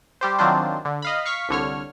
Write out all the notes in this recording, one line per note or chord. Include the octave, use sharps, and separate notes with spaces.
G3 G4 C5
D#3 F#3 C4 D4 F4 C5
D3
D#5 F5 B5
F5 C#6 B6
C2 D3 C#5 F6